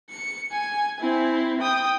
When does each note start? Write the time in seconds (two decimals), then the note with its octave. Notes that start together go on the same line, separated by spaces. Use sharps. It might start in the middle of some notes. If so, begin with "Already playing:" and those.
0.10 C#7
0.52 G#5
1.00 C4 E4
1.61 G5 D#6